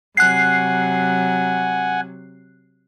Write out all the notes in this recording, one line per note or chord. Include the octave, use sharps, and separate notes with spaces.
C3 F#3 F#5 G#5 F#6 C7